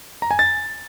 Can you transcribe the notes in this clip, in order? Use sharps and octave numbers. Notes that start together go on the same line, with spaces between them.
A#5
G#5
A6